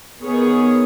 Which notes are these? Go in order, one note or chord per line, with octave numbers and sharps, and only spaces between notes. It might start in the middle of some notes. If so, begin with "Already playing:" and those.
D#3 B3 G#4 C#5